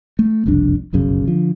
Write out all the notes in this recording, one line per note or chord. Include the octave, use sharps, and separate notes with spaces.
A3
F#1 C2 F2 D4
F1 B1 F#2 C#3
D3 F3